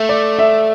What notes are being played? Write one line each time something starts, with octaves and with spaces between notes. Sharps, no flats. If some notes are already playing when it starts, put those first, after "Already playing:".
Already playing: A3 E5
D5
E5